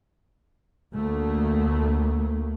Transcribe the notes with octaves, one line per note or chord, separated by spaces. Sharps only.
D2 A3 A#3